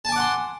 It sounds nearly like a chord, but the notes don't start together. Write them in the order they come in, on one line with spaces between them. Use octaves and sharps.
A5 G#5 D6 F#5 C6